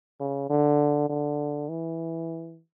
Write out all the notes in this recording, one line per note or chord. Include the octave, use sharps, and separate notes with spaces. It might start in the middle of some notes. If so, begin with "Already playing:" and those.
C#3
D3
D3
E3